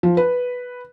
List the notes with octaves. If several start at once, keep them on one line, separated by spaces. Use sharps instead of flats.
F3
B4